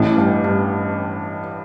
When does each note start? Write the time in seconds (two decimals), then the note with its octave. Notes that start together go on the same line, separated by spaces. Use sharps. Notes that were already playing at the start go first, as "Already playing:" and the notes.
Already playing: A1 A2
0.17 G2
0.44 G2